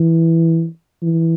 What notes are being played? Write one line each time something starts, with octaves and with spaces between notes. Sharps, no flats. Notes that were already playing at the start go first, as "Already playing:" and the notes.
Already playing: E3
E3